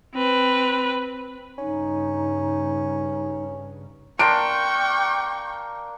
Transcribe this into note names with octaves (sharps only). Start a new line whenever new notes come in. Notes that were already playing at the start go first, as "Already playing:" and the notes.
C4 B4
G2 C#3 C#4 D#4
A#3 D4 G5 C6 C#6 D7